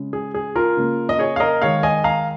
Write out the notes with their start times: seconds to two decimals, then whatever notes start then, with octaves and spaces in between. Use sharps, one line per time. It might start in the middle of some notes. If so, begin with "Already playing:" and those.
Already playing: C#3 G#3
0.13 G#4
0.34 G#4
0.55 F4 A#4
0.77 C#3 A#3
1.09 D#5
1.19 G#4 C#5
1.36 F5
1.40 A#4 D#5
1.62 D#3 G#3 C#5 F5
1.83 D#5 G#5
2.04 F5 A#5